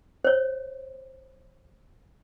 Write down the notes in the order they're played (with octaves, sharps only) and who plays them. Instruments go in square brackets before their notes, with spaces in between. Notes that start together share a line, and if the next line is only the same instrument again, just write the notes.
[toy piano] C5 C#5